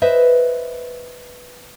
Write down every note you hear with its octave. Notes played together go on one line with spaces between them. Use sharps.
B4 C5 D#5 E5